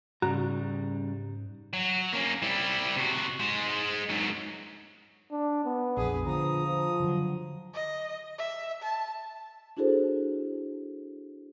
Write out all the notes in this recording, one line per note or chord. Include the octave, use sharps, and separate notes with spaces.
G#2 C#3 G3 F#4 A#5
F#3
A#3 C#4
G3 E4
C3 F#4
G#3 C5
G#2 F#3
D4
B3
A#1 F2 G#4 B4
D3 F3 A#5 D#6
F3
D3 D#3 F#3
D#5
E5
A5
D4 E4 F#4 G#4 A4 C5